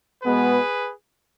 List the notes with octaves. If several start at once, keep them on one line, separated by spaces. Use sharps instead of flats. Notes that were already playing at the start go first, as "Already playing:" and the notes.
B2 G#3 B3 G#4 B4